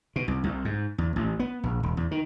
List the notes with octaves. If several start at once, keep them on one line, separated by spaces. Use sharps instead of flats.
B2
C2
C2
G#2
E2
A1
B3
A#1
E1
E2
D#3